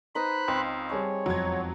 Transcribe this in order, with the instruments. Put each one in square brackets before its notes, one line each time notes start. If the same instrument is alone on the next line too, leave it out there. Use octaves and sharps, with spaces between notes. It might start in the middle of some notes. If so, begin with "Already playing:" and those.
[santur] D#4 B4 D#5 [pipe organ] C5 B5 F#6
[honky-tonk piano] C#2 [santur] C4
[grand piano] G3 G#4 A5 [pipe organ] C#5
[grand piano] E1 F2 [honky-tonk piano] F#3 G#6 [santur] A#5